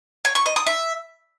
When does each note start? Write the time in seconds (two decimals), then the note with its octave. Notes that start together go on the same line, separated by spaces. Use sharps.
0.25 C#5
0.35 C#6
0.46 D#5
0.56 D#6
0.67 E5